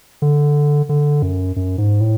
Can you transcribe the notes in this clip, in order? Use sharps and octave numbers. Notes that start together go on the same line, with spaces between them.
D3
D3
F#2
F#2
G#2
A2